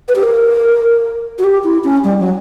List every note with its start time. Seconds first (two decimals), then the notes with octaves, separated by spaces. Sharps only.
0.09 B4
0.16 G4
0.23 A#4
1.39 F#4
1.44 G4
1.64 E4
1.84 C#4
2.04 G3
2.19 F#3